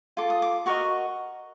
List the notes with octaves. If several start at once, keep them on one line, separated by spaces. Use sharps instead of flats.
F4 A4 D6
D#6
D6
F#4 A#4 D#5 C#6